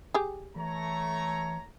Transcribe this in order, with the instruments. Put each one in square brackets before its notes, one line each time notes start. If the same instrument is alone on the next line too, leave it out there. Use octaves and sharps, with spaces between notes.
[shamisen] G4 G#4
[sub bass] E3 [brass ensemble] A3 C#5 A#5